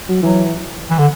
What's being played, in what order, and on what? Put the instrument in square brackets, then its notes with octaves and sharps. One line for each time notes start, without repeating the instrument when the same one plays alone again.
[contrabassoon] F#3
[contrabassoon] E3 [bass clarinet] F#3
[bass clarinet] E3
D3